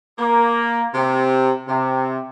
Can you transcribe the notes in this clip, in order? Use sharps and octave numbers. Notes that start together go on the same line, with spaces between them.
A#3
C3
C3